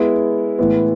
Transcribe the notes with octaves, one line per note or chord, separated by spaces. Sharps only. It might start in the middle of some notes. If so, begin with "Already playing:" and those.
Already playing: G#3 B3 E4
A2 E3 G#3 B3